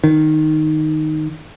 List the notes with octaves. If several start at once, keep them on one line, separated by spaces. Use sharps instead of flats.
D#3